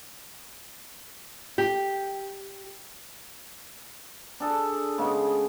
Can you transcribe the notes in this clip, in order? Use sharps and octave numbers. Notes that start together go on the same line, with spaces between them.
G4
D4 G#4 A4 D5
C#3 G#3 B3